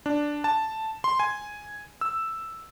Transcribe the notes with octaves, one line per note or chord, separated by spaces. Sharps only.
D4
A5
C6
G#5
E6